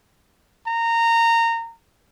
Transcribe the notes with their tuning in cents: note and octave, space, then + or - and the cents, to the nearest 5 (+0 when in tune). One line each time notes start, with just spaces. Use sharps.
A#5 -20